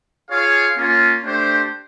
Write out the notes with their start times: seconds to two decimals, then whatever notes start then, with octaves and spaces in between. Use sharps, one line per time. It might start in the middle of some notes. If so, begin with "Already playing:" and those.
0.30 F4 G#4 C#5 F5
0.77 A#3 C#4 F4
1.23 A3 D4 G4 C5